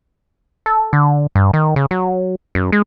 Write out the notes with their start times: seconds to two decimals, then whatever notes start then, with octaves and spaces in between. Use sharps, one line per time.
0.66 A4
0.93 D3
1.35 G2
1.53 D#3
1.76 C#3
1.91 F#3
2.55 F#2
2.72 G#3